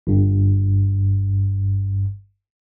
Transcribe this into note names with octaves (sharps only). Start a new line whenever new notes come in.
G1 G2